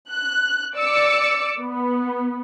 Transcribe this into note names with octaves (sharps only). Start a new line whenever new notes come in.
F#6
D5 D6 E6 C#7
B3